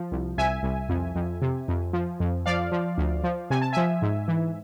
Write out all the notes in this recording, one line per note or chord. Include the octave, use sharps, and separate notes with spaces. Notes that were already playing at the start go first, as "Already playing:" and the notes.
Already playing: F3
C2
C2 E5 G#5
C2
F2
F2
C3
F2
F3
F2
F3 D5 F5
F3
D2
F3
C3 G#5
A5
F3 E5 G#5
G#2
E3